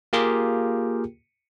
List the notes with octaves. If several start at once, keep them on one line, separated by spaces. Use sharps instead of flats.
A#3 F4 G4 G#4 A#4 G5